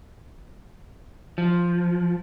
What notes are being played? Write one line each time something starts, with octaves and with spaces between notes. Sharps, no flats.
F3